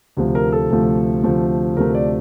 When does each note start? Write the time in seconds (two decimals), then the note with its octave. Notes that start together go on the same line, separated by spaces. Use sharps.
0.17 D2 C3 F3 A3
0.35 A#4
0.52 A4
0.70 D2 C3 F3 A3
1.23 D2 C3 F3 A3
1.77 D2 C3 F3 A3 A#4
1.95 D5